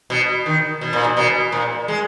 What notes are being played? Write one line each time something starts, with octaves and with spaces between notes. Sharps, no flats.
B2
D#3
B2
A#2
B2
B2
A#2
G#3